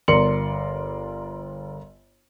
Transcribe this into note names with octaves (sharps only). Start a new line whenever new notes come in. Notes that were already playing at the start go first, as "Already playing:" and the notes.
G1 A#4 D5 C6 C#7 F#7